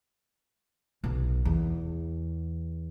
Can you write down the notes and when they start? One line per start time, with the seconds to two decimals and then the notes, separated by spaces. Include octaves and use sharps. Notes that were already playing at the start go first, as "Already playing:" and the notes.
1.04 B1
1.45 E2